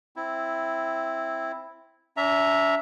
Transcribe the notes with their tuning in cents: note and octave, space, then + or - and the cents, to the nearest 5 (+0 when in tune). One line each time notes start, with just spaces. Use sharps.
C4 +0 E4 +0
D4 -45 E5 +0 A#5 +0